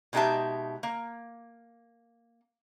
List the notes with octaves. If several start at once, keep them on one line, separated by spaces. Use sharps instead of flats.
B2 G#3 D#4 G4 E5 A5
A#3